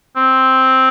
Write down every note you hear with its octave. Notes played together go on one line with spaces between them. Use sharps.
C4